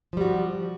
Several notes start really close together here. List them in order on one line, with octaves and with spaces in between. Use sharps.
F3 G3 F#4